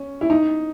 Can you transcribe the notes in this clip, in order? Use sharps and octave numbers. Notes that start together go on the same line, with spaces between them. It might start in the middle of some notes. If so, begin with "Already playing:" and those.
Already playing: C#4
E4
D#4